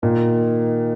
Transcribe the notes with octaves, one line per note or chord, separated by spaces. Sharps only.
A#2 D#3